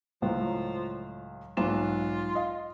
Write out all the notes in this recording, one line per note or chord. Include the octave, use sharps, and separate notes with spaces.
C#2 A2 F3 F#3
B1 G#2 F4 E7
D#5 F5